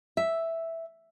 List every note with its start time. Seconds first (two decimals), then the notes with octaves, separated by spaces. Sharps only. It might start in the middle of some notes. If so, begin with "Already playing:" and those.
0.17 E5